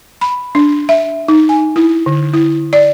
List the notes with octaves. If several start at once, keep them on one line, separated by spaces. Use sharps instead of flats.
B5
D4
E5
D#4
G#5
E4
D3
E4
D5